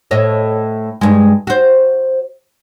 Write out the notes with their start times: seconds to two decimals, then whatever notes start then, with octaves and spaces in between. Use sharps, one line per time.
0.11 A2 C#5 D#5
1.01 G2 G#3
1.47 F#4 C5